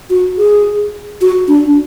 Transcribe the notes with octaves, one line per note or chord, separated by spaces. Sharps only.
F#4
G#4
F#4
D4